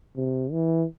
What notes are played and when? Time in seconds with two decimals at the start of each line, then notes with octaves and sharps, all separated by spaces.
0.16 C3
0.52 E3